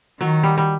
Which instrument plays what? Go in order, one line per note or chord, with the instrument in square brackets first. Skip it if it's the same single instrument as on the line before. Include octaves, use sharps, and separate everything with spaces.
[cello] D#3 [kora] F#3
[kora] G3
G3